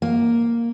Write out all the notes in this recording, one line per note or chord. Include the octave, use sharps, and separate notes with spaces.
A#3